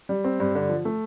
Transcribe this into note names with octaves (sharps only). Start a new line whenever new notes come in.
G3
C4
G2
D3
F3
A3